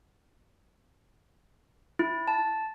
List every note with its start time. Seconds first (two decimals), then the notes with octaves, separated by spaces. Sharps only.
1.99 E4
2.28 A5